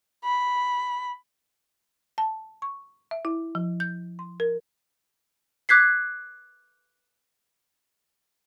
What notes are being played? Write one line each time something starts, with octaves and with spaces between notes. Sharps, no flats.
B5
A5
C#6
E5
E4
F3
G6
C6
A#4
D6 F#6 G#6 B6 C7